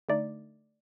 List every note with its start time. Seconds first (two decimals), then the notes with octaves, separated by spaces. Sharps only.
0.09 D3 A3 D#4 D5